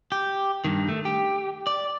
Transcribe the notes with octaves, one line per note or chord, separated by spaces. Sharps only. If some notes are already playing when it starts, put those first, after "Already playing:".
G4
G2 D#3
A3
G4
D5